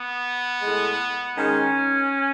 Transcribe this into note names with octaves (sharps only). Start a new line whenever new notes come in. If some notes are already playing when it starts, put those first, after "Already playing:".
Already playing: B3
A2 G#3
D#3 G#3 C#4